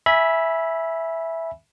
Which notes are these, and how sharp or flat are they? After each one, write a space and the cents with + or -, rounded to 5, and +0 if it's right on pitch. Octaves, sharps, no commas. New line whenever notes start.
E5 +0 G#5 +0 B5 -20